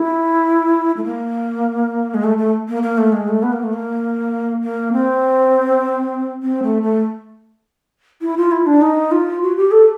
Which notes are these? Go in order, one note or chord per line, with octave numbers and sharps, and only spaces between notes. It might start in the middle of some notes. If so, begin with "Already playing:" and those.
Already playing: E4
A3
A#3
G#3
A3
A3
A#3
A#3
A3
G#3
A3
B3
A#3
A3
A#3
A#3
C4
C4
A3
A3
E4
F4
E4
D4
D#4
F4
F#4
G4
A4